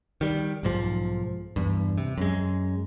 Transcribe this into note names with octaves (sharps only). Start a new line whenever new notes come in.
D#3 G3
B1 G#2 F3
E2 G2
C3
F#2 G#3